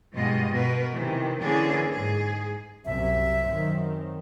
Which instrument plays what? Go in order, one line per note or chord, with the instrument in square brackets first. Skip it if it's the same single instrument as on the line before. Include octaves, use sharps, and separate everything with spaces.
[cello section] G2 B2 G#3 F4 D#5
B2 A#4 B4
C3 D#3 E3
D3 E3 A#3 C#4 D4 G#4
G#2 G#4
[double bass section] C2 F#2 C3 [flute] E5
[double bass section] F#2 D#3 C4